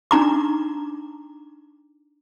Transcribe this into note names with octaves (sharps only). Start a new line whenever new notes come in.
D4 D#4 A#5 D6